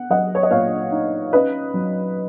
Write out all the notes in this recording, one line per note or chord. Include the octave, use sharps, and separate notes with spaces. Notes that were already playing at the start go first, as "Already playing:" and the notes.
Already playing: B3 F#5
F#3 D#5 F#5
C#5
D#5
A#2 C#5 F5
D#4
C#4 B4 D#5
F#3